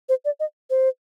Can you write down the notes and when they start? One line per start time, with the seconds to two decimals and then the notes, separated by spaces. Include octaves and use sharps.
0.09 C5
0.25 D5
0.40 D#5
0.70 C5